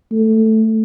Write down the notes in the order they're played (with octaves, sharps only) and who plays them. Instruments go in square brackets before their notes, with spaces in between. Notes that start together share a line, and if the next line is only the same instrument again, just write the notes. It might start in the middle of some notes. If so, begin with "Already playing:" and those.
[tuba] A3